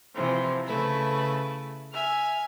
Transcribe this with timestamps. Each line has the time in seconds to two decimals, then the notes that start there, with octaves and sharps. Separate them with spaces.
0.14 C3 E3 F3 C4
0.66 C#3 A3 E4 B4
1.92 E5 G#5 F6